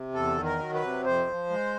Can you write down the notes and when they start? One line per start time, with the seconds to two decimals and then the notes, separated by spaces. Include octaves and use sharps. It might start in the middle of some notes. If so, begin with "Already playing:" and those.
Already playing: C3
0.14 E2 A4
0.37 D#3
0.44 A#4
0.59 F#3
0.75 B4
0.82 C3
1.04 F2 C5
1.27 F3
1.50 G#3